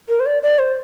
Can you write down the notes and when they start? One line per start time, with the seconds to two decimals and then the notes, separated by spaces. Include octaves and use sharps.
0.09 A#4
0.20 C5
0.26 D5
0.43 D5
0.59 C5